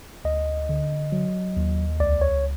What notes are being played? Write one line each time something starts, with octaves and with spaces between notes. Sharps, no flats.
D2 D#5
D3
F#3
D#2
C#2 D5
C#5